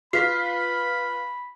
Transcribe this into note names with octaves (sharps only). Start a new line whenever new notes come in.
F4 B4 B5 B6 C7